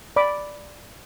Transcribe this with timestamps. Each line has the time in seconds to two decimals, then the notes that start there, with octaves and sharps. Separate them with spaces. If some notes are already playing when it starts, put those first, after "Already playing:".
0.16 D5 B5 D6